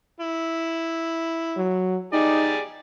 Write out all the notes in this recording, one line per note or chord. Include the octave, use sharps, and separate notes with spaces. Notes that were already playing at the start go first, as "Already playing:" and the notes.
E4
F#3
D#4 G4 G#4 D5